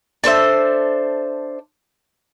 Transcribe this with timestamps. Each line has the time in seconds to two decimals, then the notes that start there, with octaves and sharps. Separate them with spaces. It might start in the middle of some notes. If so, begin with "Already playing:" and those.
0.24 D4 A4 C5 E5